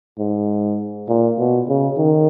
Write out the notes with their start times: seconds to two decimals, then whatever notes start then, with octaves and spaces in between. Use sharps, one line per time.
0.19 G#2
1.08 A#2
1.38 B2
1.68 C#3
1.98 D#3